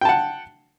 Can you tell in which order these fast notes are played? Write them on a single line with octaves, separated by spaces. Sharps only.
G5 A5 F#5